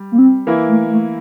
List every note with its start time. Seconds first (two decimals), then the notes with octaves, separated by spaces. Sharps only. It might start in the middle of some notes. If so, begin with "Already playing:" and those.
Already playing: G3
0.12 A#3
0.18 C4
0.47 E3 A#3 E4
0.69 A3
0.91 A3